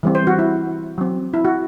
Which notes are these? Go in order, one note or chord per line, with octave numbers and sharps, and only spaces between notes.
E3 G3 C4
C5
F#4
E4
F#3 C4
E4
F#4